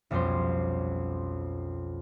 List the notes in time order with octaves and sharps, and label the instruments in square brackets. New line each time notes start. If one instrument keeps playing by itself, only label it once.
[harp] B1 F2 G3 C#4 C5